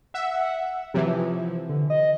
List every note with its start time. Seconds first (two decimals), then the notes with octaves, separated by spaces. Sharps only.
0.14 E5 F#5
0.94 C3 E3 F#3
1.07 F3
1.69 D3
1.90 D#5